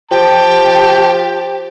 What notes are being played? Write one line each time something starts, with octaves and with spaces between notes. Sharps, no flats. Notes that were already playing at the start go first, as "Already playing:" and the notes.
F3 G4 G5 A5